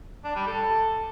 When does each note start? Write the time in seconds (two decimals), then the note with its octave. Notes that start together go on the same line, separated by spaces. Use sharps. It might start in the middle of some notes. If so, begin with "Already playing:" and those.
0.24 D4
0.36 G3
0.47 A4